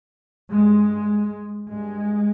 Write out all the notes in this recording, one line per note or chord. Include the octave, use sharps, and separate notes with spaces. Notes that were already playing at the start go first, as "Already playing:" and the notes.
G2 G#3
G2 G#3